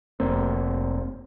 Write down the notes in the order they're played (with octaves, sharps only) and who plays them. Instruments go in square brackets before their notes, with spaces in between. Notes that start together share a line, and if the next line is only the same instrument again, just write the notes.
[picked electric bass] F1 A#3 C4